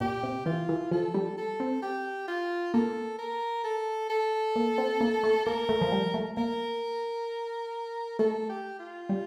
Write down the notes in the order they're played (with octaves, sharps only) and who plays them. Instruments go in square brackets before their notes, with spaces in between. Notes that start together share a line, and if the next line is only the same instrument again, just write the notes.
[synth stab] A#2 [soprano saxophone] G4
[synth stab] C3
[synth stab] E3 [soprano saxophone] F4
[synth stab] E3
[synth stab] F3 [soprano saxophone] A4
[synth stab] G3
[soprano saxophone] A4
[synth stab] C4
[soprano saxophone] G4
F4
[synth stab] A#3 [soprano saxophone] A4
[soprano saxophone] A#4
A4
A4
[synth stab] A#3
C4
A#3
A3
[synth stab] A#3 [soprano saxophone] A#4
[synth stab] A3
F3
G3
A3
[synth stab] A#3 [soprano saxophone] A#4
[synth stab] A3 [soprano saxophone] A4
[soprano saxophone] G4
F4
[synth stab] G3